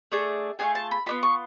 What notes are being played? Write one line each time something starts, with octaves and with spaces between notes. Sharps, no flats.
A3 D4 G#4
A3 D4 F4 G#4 G#5
A5
B5
B3 D4 F4 B5
C#6